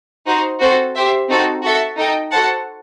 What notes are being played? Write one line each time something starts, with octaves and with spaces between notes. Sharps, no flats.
D#4 F#4 C5
C4 F#4 A4 C5
G4 C5 E5
C4 D#4 F#4 A4
F#4 A4 E5 A5
D#4 A4 D#5 G5
F#4 A4 C5 F#5 A5